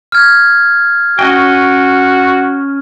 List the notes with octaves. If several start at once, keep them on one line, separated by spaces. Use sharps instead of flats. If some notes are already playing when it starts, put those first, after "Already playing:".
F6 G#6
C#4 F#4 D#5 G5